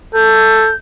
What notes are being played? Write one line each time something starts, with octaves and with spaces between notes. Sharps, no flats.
A4 G6